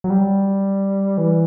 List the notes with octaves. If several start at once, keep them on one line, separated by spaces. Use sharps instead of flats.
F#3
G3
E3